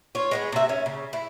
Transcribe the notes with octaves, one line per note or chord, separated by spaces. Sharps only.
F4 C#5
G#3 B3 G#4
C3 E5
C#4
C#3
E4